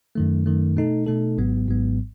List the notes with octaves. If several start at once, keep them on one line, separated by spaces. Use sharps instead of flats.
F#2 D#3 A3
F#2 D#3 A3
B2 A3 D#4 A4
B2 A3 D#4 A4
G#1 G#2 F#3 B3
G#1 G#2 F#3 B3